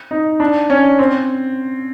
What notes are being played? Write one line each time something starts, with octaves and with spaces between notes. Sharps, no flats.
D#4
D4
C#4
C4